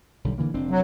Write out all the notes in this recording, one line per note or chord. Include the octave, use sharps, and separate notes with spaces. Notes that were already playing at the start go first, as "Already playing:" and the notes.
B1 D3 G3
D3 E3 A#3
F1 C4 D4
F#3